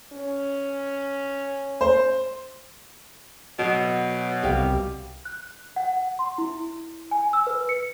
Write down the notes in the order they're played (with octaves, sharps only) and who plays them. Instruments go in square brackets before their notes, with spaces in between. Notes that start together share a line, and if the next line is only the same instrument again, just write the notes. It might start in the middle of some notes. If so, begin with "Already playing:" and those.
[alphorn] C#4
[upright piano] C5
[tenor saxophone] B2 [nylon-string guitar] F#3
[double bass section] C2 G3 [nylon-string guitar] G4 F5
[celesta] F#6
F#5
F#5
C6
E4
G#5
E6
B4
C#7